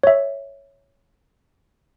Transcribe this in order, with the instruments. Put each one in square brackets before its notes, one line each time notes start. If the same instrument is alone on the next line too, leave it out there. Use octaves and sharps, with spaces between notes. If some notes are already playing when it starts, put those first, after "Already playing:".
[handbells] C#5 E5